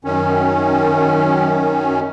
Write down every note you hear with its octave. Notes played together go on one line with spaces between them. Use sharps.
F#2 D#3 C#4